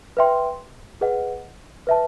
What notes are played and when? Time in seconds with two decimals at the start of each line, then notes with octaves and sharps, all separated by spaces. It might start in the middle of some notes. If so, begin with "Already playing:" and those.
0.17 B4 E5 G5 C6
1.01 G#4 B4 D#5 F#5
1.87 B4 E5 A5